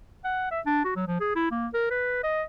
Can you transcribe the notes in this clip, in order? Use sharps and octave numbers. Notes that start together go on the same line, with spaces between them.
F#5
E5
D4
F#4
F#3
F3
G#4
E4
A#3
A#4
B4
D#5